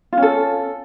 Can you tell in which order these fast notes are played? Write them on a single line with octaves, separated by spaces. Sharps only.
F4 C#4 A4